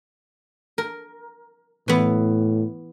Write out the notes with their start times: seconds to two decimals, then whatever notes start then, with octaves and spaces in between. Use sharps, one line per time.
0.78 A#4
1.88 A2 E3 B3